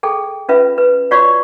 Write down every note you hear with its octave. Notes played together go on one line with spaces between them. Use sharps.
G#4 A4 G5
C#4 F4 B4 E5
B4
F4 F#4 C#5 D5 C#6